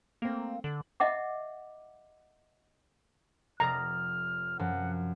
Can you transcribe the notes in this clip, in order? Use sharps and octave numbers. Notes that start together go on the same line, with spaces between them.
A3 A#3 C4
D3 F#7
D#5 E5 F#5 D6
F1 D5 A#5 D#6 F6
F#2 F3 F#5